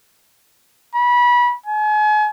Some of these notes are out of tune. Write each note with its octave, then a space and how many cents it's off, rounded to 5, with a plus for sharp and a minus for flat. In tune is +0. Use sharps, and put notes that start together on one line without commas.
B5 -25
G#5 +40